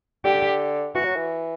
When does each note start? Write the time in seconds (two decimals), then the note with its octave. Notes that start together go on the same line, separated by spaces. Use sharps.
0.25 D3 G4
0.95 E3 F#4
1.05 F#3
1.16 E3